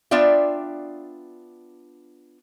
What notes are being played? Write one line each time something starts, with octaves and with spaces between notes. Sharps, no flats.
B3 D4 F4 D5 E5 G5